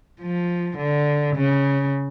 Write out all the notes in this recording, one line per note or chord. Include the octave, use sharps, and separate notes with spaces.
F3
D3
C#3